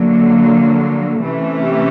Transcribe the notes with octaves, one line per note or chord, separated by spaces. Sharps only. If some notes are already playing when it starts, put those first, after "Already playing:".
Already playing: D3 F#3 A#3
C3 E3 A3 C#4
G4